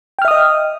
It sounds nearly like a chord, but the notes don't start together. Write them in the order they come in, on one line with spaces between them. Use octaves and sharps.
G5 F6 E5 D#6 D#5